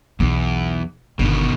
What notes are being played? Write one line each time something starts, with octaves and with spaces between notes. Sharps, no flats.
B1 E2
G1 B2 D#3